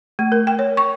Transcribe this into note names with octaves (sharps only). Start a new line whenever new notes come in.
A3
A#4
G5
C#5
C#6